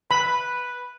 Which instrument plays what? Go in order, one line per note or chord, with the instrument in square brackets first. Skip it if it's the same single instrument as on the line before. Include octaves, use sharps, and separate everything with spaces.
[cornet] B4 [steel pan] B5